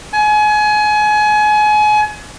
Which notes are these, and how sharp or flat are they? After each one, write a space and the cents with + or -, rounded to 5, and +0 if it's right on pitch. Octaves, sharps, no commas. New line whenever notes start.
G#5 +30